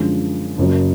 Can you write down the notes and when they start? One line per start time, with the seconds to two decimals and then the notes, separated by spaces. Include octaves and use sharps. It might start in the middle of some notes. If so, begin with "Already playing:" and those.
Already playing: F#2 D3 F3 G#3
0.58 F#1 F#2 C#3 F#3